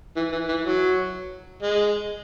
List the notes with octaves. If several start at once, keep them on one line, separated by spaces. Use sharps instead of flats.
E3
E3
E3
F#3
G#3